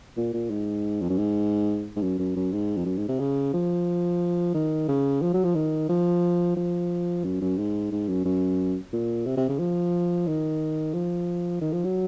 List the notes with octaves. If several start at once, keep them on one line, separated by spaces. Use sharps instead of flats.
A#2
A#2
G#2
F2
F#2
G#2
G#2
F#2
F#2
F#2
G#2
F2
F#2
G#2
C3
C#3
F3
D#3
C#3
F3
F#3
F3
D#3
F3
F3
F#2
F#2
G#2
G#2
F#2
F#2
A#2
C3
C3
C#3
F3
D#3
F3
D#3
F3
F#3